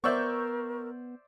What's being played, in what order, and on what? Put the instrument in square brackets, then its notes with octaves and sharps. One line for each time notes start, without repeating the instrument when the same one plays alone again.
[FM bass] B3 [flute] A#4 [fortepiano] C5 D5 E5 [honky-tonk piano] C#6 E6 G6